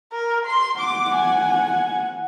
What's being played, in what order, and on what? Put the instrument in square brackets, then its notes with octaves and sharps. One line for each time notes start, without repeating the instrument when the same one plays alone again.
[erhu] A#4
C6
[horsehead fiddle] F#5 [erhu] D6
[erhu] G#5